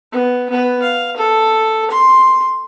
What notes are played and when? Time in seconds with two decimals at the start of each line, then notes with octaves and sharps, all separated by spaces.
0.12 B3
0.50 B3 B4
0.82 F5
1.17 A4
1.91 C6